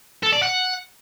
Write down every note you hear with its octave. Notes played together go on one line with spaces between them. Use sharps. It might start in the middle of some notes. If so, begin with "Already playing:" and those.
A4
D5
F#5